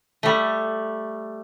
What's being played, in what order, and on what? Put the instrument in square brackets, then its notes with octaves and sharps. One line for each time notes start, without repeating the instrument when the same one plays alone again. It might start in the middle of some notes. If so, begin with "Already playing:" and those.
[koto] G3 A3